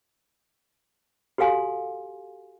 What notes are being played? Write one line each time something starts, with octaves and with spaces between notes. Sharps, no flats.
F#4 G4 A4 F5 G#5 C6